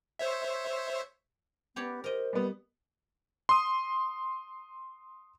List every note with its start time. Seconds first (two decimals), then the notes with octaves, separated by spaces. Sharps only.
0.19 C5 C#5 E5
1.76 B3 G4 C#5 D5
2.04 A#4 C5 D#5
2.33 G3 B3
3.49 C6 D#6